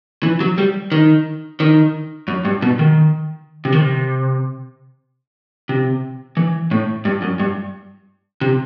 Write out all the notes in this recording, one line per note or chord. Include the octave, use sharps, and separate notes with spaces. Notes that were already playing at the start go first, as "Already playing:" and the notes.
E3
F#3
G3
D#3
D#3
F#2
G2
B2
D#3
C3
D#3
C3
C3
E3
A2
G2
F#2
G2
C3